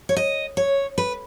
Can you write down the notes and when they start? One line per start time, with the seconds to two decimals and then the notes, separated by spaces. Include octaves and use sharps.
0.09 C#5
0.16 D#5
0.57 C#5
0.98 B4